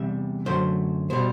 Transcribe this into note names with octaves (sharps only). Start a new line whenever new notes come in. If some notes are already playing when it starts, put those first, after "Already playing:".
Already playing: E2 C3 G3 E5
F#2 D3 F#3 A3 C5
B2 G3 C5